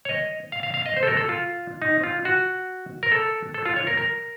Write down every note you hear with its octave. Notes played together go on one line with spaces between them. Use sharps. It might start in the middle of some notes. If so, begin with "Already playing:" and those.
C#5
D#5
F5
F5
F5
D#5
C5
A4
A#4
A4
F4
D#4
F4
F#4
A#4
A4
A4
F4
C#5
A#4
A#4